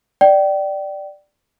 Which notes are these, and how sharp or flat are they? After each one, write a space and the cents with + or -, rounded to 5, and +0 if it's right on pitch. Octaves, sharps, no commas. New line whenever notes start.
D5 +5 G5 -30